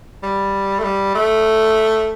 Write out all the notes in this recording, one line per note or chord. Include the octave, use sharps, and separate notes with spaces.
G3
A3
G3
A3